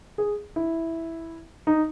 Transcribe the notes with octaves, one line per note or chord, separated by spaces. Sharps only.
G#4
E4
D#4